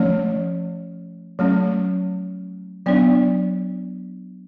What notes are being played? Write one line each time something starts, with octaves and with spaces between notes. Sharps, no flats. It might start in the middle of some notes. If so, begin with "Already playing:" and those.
Already playing: F3 A3 C#4 C#5
F#3 A3 C#4
F#3 B3 D4 D5